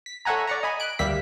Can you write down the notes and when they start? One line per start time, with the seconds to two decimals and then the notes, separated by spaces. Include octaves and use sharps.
0.06 B6
0.25 A4 C#5 E5 F#5 G#5 A#5
0.47 D5 F#5 A#5
0.63 D#5 G#5 B5
0.80 F#6 D7
0.99 D2 G3 A#3 G4 E5 B6